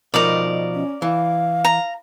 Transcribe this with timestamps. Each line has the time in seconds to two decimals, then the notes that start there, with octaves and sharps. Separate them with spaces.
0.14 B2 F3 D#4 A#4 D5
0.74 C#4
1.02 E3 F5
1.65 A#5